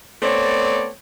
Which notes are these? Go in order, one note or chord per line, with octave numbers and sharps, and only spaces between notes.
A3 B3 C4 C#5 D5